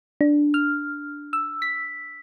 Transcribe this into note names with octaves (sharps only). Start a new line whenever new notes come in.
D4
F6
E6
B6